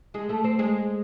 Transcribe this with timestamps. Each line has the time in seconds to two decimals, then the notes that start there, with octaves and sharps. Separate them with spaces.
0.14 G#3 G#4
0.29 A3 A4
0.44 C4 C5
0.59 G#3 G#4